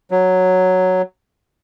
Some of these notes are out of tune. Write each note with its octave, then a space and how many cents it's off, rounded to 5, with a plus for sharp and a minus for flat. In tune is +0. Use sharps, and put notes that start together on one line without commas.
F#3 +0